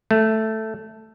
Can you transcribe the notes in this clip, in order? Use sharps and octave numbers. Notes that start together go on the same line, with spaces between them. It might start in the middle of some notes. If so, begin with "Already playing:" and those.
A3